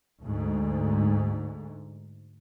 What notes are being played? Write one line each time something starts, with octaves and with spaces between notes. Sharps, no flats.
D2 G#2